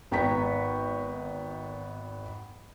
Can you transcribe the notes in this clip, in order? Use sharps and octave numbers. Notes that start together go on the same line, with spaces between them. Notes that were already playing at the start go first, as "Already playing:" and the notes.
G#1 B3 G5 A#5 C#6 B6